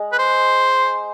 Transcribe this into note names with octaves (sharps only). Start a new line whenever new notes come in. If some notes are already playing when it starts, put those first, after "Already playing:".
Already playing: G#3
B4
C5